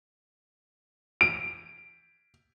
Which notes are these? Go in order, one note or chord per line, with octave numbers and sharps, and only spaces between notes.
D7